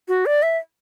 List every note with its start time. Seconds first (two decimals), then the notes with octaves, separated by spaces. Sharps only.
0.08 F#4
0.26 D5
0.43 E5